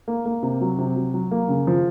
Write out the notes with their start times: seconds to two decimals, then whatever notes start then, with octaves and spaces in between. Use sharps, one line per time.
0.08 A#3
0.26 A#3
0.43 C3
0.61 F#3
0.79 C3
0.96 F#3
1.14 F#3
1.31 A#3
1.49 C#3
1.67 F3